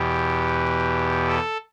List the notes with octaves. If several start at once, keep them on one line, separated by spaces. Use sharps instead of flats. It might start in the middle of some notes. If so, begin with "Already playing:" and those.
Already playing: E2 B2 G4
A4